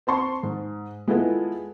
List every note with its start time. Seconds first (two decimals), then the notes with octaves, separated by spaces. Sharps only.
0.07 C4 A5 C6 C#6
0.43 G#2
1.08 G#3 B3 E4 F4 A4 B4